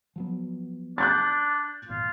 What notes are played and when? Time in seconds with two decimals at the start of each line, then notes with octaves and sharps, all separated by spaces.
0.16 F3 F#3 B3
0.98 D4 F#6 G6 A6
1.89 D1 G#1 A#2 F4